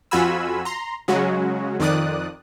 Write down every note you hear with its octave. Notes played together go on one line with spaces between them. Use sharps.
F2 F4 F#4 G#5 B5 E6
A#5 C6
C#3 F#3 G#3 C#4 F#4
F2 D#3 D5 D#6 F#6